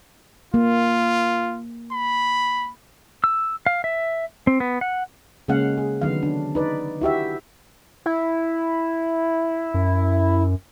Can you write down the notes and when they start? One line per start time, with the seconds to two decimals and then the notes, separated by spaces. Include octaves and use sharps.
0.54 A#3 F4
1.92 B5
3.24 E6
3.66 F5
3.84 E5
4.47 C4
4.60 B3
4.81 F#5
5.48 C#3 G#3 A#3 C#4 F5 F#5
5.78 G#4
6.02 D3 D#3 F#3 B3 F5
6.23 D4
6.55 D#4 B4 D5
7.01 E4 F#4 G4 E5
8.06 E4
9.74 F#2